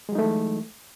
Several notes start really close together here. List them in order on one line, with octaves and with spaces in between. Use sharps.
G#3 F#3 D#4 A3 E3